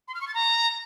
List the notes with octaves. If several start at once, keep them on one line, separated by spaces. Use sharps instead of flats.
C6
F6
C#6
A6
A#5